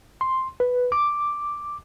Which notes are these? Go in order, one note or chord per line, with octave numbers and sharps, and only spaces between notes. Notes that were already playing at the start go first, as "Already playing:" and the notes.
C6
B4
D6